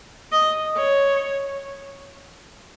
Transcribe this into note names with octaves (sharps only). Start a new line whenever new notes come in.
D#5
C#5